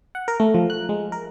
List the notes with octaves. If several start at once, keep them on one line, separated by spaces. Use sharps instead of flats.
F#5
A#4
A3
F3
F#6
G#3
A#4